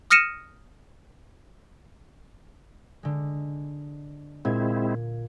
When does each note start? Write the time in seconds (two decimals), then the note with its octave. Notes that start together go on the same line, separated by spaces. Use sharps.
0.10 D#6 F6 A#6 C#7 D#7 E7
3.03 D3 G#3
4.45 A#2 G#3 C4 E4 G#6